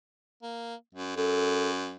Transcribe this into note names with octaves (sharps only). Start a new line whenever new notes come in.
A#3
F#2
F#2 A4